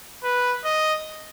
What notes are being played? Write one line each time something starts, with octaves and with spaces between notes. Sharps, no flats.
B4
D#5